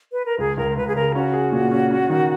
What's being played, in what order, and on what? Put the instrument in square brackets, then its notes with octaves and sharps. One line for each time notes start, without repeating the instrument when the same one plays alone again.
[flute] B4
A#4
[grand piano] C#2 [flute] G#4
[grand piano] C#2 [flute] A#4
[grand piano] C#2 [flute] B4
[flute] G#4
[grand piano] C#3 [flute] A#4
[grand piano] C#4 [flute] F#4
[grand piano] G#4
A#2
C#4
C#4
D#3